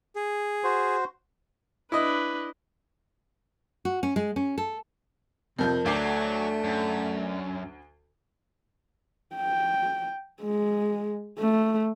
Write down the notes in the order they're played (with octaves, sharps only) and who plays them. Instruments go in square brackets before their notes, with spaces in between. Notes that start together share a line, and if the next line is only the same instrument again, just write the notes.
[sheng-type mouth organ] G#4
[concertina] F#4 C5
[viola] D4 B4 [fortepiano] E4 D#5
[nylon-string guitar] F#4
C#4
G#3
C#4
A4
[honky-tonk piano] F2 F3 G6 [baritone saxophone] C3 [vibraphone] A#4
[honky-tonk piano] D2 D6 C7 [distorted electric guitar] F#3 [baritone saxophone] A3 [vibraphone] D5
[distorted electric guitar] F#2
[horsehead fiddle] G5
G#3
A3